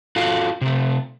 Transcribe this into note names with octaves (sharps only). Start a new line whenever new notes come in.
F4 F#4 A4 F5
C3 A3